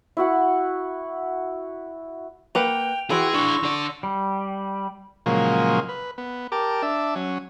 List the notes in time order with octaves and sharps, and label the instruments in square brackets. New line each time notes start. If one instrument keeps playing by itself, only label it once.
[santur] E4 F#4 F#5
[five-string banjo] A#3 B4 F#5 [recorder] G5 [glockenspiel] G6 F7
[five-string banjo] E3 G5 [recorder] F#4 [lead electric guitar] G#4 [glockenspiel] C6 E6 A#6
[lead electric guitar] D4 G#4 [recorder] C#6
[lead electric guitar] D3 D5
[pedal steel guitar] G3
[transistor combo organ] A#2 C#3 F3 F#3 G#3 A#3
B4
B3
G4 A#4 A5 D6
D4 E5 A5
F#3 C#4